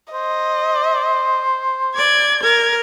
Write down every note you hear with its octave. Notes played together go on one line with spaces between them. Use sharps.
C5 D#5
D5 G#6
A#4 G#6